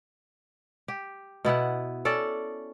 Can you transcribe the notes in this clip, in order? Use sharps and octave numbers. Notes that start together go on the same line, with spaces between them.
G4
B2 B3 E4 F#5
C#4 A4 D5